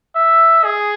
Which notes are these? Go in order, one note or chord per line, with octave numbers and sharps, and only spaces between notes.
E5
G#4